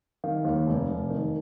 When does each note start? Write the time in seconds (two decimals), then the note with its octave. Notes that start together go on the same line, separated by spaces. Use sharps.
0.24 D#3 F5
0.45 D#2
0.67 F1
0.89 F1
1.10 D#3